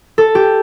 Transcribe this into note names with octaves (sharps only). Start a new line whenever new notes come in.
A4
G4